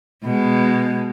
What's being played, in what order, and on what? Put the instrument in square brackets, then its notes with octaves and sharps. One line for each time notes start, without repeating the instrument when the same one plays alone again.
[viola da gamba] B2 G#3